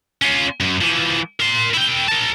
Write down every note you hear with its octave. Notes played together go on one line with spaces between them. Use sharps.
C#4 F4
F#2
E3 F3
A#4 C6
E4 G5
A#4 A5